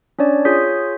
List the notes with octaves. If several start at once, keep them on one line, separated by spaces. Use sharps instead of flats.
C#4 D4 C#5 D5
F4 G#4 C#5 D#6 G6 B6